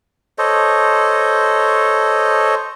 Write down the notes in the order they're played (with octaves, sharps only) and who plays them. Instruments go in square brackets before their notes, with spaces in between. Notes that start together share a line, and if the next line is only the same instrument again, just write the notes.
[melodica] A4 C5 C#5 D#5